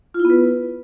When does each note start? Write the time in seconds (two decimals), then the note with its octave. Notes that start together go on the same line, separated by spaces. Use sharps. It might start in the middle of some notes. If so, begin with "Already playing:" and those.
0.14 F4
0.20 E4
0.25 B3
0.30 B4